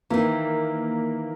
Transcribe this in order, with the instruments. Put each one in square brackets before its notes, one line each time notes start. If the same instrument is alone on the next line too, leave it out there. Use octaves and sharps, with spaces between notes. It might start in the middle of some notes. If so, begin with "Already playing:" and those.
[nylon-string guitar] D#3 E3 [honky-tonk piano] A#3